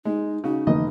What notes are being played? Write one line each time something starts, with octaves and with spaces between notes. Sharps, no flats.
G#3 D#4
C#3 D#4 F#4
F1 D3 E3 A#3 D#5